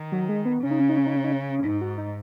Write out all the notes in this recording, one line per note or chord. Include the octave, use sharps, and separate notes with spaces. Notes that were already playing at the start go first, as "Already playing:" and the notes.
Already playing: D#3
F#3
G#3
B3
C#3 C#4
D#4
C#4
D#4
C#4
D#4
C#4
D#4
C#4
C#4
G#2 D#4
F#4
D#4